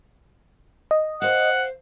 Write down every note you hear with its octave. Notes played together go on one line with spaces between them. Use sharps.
D#5
C5 F5 F#5